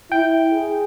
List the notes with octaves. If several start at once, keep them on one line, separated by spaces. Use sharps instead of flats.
E4 G5
G#4